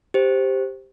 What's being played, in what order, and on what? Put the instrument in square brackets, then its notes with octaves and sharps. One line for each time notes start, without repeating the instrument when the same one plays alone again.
[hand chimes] G4 C5